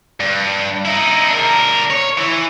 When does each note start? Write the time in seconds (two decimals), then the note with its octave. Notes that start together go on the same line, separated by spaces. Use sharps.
0.20 G2
0.86 D#4 E4
1.29 D4 A#4
1.90 C#5
2.17 E3 E4